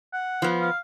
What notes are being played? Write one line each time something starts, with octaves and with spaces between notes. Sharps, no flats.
F#5
F3 B3
F5